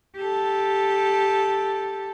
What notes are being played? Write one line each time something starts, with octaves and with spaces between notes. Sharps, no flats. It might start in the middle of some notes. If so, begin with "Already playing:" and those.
G4 A4